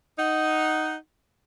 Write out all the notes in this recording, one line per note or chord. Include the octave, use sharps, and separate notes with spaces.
D#4 F#5